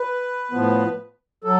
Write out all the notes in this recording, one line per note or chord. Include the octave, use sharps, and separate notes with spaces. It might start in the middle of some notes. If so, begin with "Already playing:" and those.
Already playing: B4
A2 F3 B3
F#3 A4